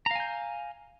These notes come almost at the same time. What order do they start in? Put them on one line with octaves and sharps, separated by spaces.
A#5 F5 G#5 G6